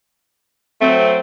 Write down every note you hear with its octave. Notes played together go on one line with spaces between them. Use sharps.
F#3 A3 C4